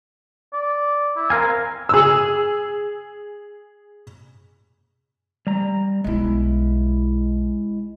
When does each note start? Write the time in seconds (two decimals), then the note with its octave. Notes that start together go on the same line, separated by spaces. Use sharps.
0.53 D5
1.16 E4
1.30 C4 A#4 F5 G#5
1.89 G#4 E6
5.47 G3 A#5
6.04 B1 G#3 B3 E4